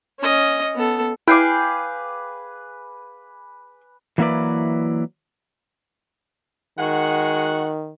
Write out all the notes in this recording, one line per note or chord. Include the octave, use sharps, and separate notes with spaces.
C#4 D#5
B3 A4
E4 G#4 B4 F5 G5 G#5 D6
E3 F#3 A#3 E4 B4 D5
D#3 G#3 F#4 F#5